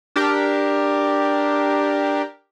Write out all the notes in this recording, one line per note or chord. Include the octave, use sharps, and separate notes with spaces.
D4 G4 A#4